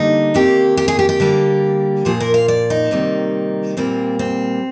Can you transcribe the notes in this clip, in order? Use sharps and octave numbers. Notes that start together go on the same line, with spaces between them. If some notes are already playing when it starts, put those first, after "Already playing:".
Already playing: D3 G3 A#3 D#4
C3 D#3 A#3 G4
G4
G#4
G4
G4
D3 G3 A#3
A#2 F3 A#3 G#4
A#4
F5
D5
D#4
C3 D#3 G3 A#3
A#2 G3 A#3 C4
C4